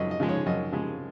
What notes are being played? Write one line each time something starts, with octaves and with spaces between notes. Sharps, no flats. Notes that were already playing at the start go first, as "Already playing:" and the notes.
Already playing: F#2 C#3 F3 G#3 D#5
D#5
C#3 F3 G#3
C#5
F#2 D#5
C#3 F3 G#3